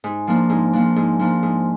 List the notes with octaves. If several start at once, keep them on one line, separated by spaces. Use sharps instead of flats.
G#2
F3 A#3 D4
G#2
F3 A#3 D4
G#2
F3 A#3 D4
G#2